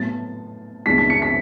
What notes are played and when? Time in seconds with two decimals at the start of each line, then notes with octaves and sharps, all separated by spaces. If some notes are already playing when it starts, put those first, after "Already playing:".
Already playing: A2 F#3 B3 A6
0.85 C#2 B2 G#3 D4 B6
0.98 B6
1.10 C#7
1.22 B6